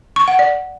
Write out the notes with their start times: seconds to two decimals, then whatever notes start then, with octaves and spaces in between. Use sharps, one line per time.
0.16 C#6
0.28 F#5
0.39 D5